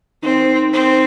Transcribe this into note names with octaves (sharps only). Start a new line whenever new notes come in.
D#3 C4
C4